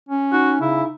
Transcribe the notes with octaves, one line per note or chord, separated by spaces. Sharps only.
C#4
D#4 F#4
C#3 E4